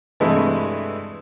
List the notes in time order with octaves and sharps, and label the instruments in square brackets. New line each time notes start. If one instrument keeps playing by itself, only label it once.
[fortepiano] G2 C3 E3 G#3 A3 E4